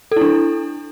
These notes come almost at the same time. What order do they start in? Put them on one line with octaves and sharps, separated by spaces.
A4 E4 D4